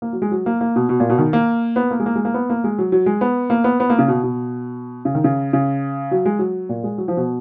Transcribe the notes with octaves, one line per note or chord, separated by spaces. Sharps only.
A#3
F#3
G#3
F#3
A#3
A#3
B2
B2
A#2
B2
D#3
A#3
B3
A#3
G#3
A#3
G#3
A#3
B3
A#3
G#3
F#3
F#3
G#3
B3
A#3
B3
B3
A#3
C#3
B2
B2
C#3
D#3
C#3
C#3
F#3
G#3
F#3
A#2
G#3
F#3
F3
B2